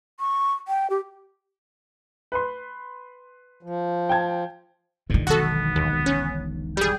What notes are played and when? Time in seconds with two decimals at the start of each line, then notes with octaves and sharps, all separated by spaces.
0.20 C#6
0.68 G5
0.90 G4
2.32 B4 B5 C6
3.63 F3
4.09 G5 A5 G#6
5.10 G2 A#2 D3 D#3
5.27 E1 B1 B3 F#4 A4
5.76 D#2
6.06 C#4
6.77 G3 G#4 G5